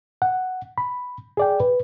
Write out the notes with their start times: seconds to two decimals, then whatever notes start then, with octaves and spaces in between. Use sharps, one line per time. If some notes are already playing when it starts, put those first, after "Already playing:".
0.22 F#5
0.78 B5
1.37 G#4 D5 G5
1.60 B4